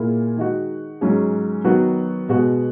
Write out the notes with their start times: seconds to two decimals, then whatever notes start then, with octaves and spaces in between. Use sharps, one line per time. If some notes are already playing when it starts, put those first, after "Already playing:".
Already playing: A#2 A#3 E4 G#4
0.37 D#3 G#3 D#4 F#4
1.01 G#2 F#3 C#4 G#4
1.64 D#3 F#3 B3 F#4
2.29 B2 G#3 B3 F#4